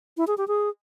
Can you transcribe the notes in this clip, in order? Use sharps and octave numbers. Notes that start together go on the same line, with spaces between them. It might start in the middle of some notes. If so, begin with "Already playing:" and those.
E4
G#4
G4
G#4